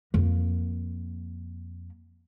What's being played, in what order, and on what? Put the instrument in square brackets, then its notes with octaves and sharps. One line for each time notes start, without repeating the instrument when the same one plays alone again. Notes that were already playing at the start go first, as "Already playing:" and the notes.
[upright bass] F2 A#3